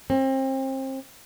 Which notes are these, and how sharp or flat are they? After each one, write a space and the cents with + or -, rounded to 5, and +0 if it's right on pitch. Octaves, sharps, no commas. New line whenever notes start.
C4 +30